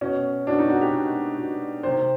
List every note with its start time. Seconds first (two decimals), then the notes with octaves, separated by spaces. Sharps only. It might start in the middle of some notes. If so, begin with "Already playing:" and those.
0.01 B2 C#4
0.47 B2 D4
0.58 D#4
0.70 F#4
0.81 G4
0.92 B2
1.38 B2
1.83 C3 D#3 C5